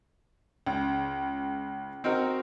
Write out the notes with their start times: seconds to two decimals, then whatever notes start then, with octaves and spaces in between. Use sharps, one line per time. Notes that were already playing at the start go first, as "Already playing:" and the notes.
0.67 C#2
2.04 C4 D#4 F#4 A#4